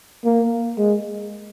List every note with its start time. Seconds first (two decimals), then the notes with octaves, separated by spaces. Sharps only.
0.25 A#3
0.78 G#3